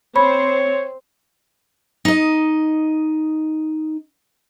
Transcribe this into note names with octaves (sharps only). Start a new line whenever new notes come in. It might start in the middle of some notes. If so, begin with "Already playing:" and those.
C4 C5 C#5 B5
D#4 D#5